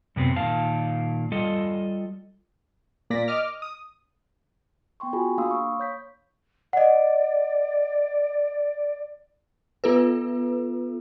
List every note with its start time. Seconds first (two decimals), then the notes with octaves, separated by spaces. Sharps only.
0.16 F#2 C3 B3 C4
0.36 A#2 D#3 F5 A5
1.32 G3 F4 A4 D#5
3.10 A#2 A#3 D5 A#6 B6
3.28 D#5 D6 F6
3.62 D#6
5.00 B3 G5 C6 C#6
5.13 F4 F#4 G#4 G#5 B5
5.38 A#3 D4 F5 C6 D#6 E6
5.50 F5 B5 C#6 D#6
5.79 C#5 G6 B6
6.73 D5 D#5 F#5
9.84 B3 F4 A4 B4